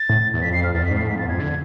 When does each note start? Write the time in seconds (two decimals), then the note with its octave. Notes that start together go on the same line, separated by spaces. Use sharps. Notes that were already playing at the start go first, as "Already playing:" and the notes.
Already playing: A6
0.09 A2
0.34 E2
0.42 F2 B6
0.53 C7
0.64 F6
0.75 E2 A6
0.82 F2
0.85 B6
0.91 G#2
0.96 C7
0.99 A2
1.07 G#2 B6
1.16 F2
1.18 A6
1.24 E2
1.29 F2 G#6
1.40 D3